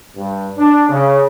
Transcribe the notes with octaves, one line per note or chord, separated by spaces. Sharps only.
G2
D4
C#3